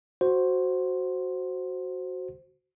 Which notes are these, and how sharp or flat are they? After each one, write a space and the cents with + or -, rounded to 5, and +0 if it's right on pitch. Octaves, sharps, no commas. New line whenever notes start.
F#4 +0 C5 +0